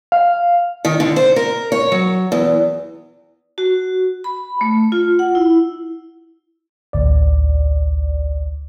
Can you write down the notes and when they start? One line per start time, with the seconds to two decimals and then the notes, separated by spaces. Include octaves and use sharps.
0.12 F5
0.85 D#3
1.00 D3
1.16 C5
1.36 A#4
1.72 C#5
1.92 F#3
2.32 E2
3.58 F#4
4.24 B5
4.61 A3
4.92 F4
5.19 F#5
5.35 E4
6.93 A1 D2 D5